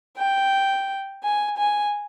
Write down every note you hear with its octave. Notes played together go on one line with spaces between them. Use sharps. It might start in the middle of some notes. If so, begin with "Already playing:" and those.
G5
G#5
G#5